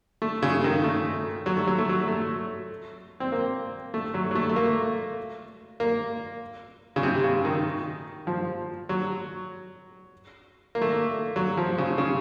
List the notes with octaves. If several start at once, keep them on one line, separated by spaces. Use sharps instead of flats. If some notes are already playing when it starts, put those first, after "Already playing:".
A3
C#3
D#3
A3
F#3
A3
F#3
A3
F#3
A3
C4
A#3
A3
F#3
F#3
A3
A3
A#3
A#3
C#3
C3
C#3
D#3
F3
F#3
A#3
A3
A#3
F#3
F3
C#3
C#3